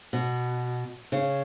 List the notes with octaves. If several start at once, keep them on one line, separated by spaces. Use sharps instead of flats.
B2
C#3